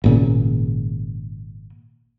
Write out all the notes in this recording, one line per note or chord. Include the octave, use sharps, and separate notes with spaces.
G#1 A#2 C#3